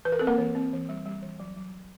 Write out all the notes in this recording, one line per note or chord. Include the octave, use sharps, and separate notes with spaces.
E3 B4
A#4
C4 A4
A#3 A#4
E3
C4
E3
G3
G3
E3
F#3
F#3
F#3